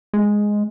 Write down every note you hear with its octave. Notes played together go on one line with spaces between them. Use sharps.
G#3